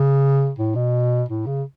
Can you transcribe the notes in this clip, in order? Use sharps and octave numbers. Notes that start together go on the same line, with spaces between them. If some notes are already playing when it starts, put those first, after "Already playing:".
Already playing: C#3
A2
B2
A2
C#3